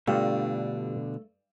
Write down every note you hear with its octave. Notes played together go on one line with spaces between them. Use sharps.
G2 B2 D3 A3 F4 G4 D5